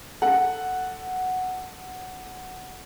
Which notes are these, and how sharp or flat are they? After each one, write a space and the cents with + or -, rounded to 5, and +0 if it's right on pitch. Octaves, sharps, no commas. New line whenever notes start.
A4 +10 F#5 +0